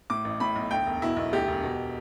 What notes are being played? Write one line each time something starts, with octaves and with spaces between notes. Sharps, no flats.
A2 D6
A1
A2 B5
B1
D2 G5
E1
B2 E4
B1
D2 G4
E1
B2